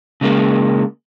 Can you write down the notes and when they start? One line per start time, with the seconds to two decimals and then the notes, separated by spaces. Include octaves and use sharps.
0.21 C#3 G#3 A#3